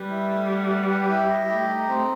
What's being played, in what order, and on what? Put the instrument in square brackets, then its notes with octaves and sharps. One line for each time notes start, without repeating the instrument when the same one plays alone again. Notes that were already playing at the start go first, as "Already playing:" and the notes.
Already playing: [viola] G3 [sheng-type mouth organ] B4
[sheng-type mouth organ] E4
A3
F#5
B4
G4
E4
D#5
[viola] A3 [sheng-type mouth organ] G4
[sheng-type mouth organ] D#4
C4